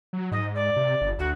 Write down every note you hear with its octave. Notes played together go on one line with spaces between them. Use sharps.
F#3
G#2 D#5
D5
C3
G1
D2 F#4